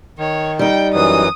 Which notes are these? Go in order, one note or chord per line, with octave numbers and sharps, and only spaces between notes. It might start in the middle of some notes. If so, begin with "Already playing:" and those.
D#3 C#5
G3 D#4 G5
F#2 E3 F#3 D#6